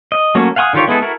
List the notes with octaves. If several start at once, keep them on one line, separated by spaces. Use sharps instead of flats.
D#5
F#3 A3 A#3 C#4 F#4
F5 F#5 G#5 C6 D#6
D3 D#3 F4 G4 C#5
G#3 B3 E4 G#4 A4
E4 F#4 A4 A#4